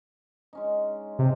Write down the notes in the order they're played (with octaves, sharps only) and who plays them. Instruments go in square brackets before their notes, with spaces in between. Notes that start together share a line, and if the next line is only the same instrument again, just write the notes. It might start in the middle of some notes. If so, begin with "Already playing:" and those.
[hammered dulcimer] G#3 C#4 D#4
[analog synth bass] C3 [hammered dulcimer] G#3